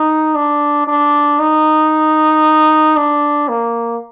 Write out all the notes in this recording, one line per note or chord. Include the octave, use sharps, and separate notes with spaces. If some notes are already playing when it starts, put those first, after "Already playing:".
Already playing: D#4
D4
D4
D#4
D4
A#3